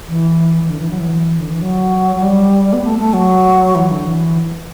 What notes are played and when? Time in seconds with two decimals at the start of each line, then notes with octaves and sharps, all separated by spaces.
0.08 E3
0.63 E3
0.70 D3
0.80 E3
0.90 F#3
1.00 E3
1.39 D3
1.51 E3
1.62 F#3
2.16 F#3
2.22 G3
2.73 B3
2.84 A3
2.99 A3
3.13 F#3
3.75 E3
3.90 D3
4.06 E3